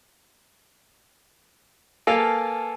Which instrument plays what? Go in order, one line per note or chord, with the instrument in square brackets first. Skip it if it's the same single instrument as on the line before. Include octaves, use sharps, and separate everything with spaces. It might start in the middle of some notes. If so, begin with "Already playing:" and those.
[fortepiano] A#3 A4 F5 [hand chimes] B4 G#5 A5